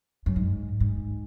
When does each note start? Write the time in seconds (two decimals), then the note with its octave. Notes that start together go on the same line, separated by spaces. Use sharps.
0.26 F#2
0.36 G#2
0.80 G#2